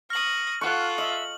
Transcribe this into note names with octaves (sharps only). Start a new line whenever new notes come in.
C#6 D#6 F6 A#6 F#7
F4 A4 F#5 C#6 F#6
D#5 E5 F#7